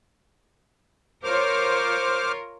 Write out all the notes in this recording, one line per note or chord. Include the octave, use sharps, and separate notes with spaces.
F4 A#4 C5 C#5 D6 F6